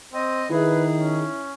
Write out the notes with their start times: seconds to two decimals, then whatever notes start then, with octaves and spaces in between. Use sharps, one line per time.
0.13 C4 D#5
0.50 D#3 E4 G#4 B4 E5
0.98 C#4